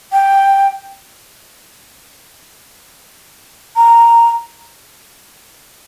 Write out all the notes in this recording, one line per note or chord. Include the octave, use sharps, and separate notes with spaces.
G5
A#5